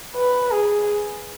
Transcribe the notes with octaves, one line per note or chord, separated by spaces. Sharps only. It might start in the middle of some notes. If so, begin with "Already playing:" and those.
B4
G#4